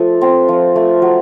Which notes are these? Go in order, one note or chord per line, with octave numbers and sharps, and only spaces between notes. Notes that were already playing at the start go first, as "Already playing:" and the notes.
Already playing: F3 A3 A4
C4
F3
A3
F#3